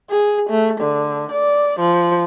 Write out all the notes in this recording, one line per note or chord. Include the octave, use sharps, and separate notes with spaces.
G#4
A3
D3
D5
F3